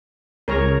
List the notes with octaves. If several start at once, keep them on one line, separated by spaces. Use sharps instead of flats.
C#2 A#4 C#5 A#5